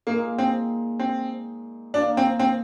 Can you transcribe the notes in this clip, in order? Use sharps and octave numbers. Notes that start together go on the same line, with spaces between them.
A#2 G#3 A#3 D#4 A#4
C4
C4
D#3 A#3 D4 D#4 A#4
C4
C4